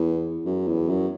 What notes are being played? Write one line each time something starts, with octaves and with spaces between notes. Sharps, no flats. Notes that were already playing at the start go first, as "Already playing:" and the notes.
Already playing: E2
F#2
E2
F#2